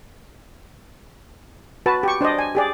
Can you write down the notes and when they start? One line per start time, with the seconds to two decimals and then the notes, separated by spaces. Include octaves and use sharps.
1.86 F#4 B4 A5
2.03 G4 C#6
2.21 D4 C5 D5 D#5
2.39 G#5
2.55 G4 G#4 D5